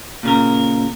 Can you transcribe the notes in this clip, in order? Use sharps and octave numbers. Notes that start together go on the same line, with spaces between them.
A#2 C#3 A#4